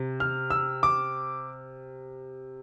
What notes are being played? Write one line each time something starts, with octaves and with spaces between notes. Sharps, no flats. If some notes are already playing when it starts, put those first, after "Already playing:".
Already playing: C3
F6
E6
D6